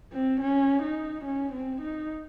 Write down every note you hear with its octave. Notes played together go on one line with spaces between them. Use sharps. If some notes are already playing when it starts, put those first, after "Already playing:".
C4
C#4
D#4
C#4
C4
D#4